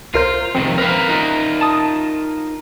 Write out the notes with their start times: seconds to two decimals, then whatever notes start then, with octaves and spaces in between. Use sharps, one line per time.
0.14 C2 F4 A#4 C5
0.55 F2 C3 D#3 C4
0.78 C4 A#4 B4 F5
1.09 D#4 F4 A#4
1.61 A5 D#6